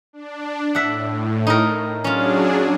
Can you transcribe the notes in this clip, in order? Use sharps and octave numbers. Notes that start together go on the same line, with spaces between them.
D4
A2 E5 F#5
D#4 A#4
F#3 C#4 D4 F4 G#4